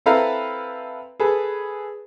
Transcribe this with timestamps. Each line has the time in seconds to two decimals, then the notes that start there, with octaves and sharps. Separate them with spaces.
0.06 C4 E4 A4 B4 F5 A#5
1.20 G#4 A4 B4